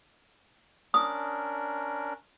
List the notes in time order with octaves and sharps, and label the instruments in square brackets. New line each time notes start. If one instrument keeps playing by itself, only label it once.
[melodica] C#4 D4 A#4 [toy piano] D#6